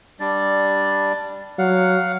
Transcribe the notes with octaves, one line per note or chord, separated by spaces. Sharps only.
G3 D4 D5
F#3 F5 F#5